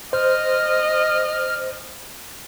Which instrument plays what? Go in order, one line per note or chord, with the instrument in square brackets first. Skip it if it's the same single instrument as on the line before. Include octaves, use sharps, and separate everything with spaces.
[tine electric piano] C5 [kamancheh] D#5 [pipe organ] F6